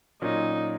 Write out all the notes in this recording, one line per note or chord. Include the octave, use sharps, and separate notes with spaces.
A#2 F#3 C#4 D#4